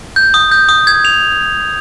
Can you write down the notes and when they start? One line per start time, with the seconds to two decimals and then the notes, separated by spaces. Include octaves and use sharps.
0.16 G6
0.34 D#6
0.52 G6
0.69 D#6
0.87 G#6
1.05 F7